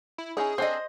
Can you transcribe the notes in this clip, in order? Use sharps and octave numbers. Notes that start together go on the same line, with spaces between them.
E4
C#4 D#4 E4 G#4
C4 D4 A4 C5 D#5